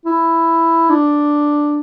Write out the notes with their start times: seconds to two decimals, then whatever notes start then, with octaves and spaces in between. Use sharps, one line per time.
0.06 E4
0.90 D4